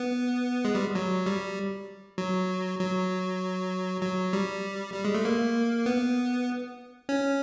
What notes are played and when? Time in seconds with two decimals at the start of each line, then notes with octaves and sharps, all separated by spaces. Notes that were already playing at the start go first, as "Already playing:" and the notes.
Already playing: B3
0.65 G#3
0.75 G3
0.95 F#3
1.26 G3
2.18 F#3
2.80 F#3
4.02 F#3
4.33 G3
4.94 G3
5.04 G#3
5.15 A3
5.25 A#3
5.86 B3
7.09 C#4